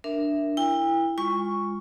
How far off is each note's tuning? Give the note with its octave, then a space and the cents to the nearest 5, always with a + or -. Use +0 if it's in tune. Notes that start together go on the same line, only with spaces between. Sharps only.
D4 +0 A#4 +0 E5 +0
E4 +10 G5 +40
G#3 -30 F4 +0 C#6 +0